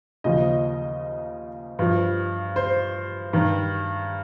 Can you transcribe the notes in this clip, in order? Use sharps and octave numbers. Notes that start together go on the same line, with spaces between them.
D#2 C#3 F3 D#5
G2 F3
C5
G2 D#3